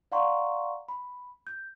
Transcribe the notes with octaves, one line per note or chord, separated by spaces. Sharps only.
D5 F5 F#5 A#5 C6 C#6
B5
G6